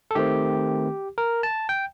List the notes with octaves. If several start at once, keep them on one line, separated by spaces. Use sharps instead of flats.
A4
D#3 A3 C4 G4
A#4
A5
G5